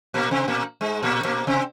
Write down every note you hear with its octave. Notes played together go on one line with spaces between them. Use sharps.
A#2 A#3
C3 C4
A#2 A#3
G#2 G#3
A#2 A#3
A#2 A#3
C3 C4